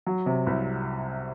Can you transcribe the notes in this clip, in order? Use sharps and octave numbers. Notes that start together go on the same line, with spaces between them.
F#3
C3
C2